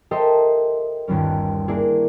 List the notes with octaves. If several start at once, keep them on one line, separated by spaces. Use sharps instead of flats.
G4 A4 A#4 C5 D#5 E5
G1 D#2 G3 C#4
A#3 D4 E4 G#4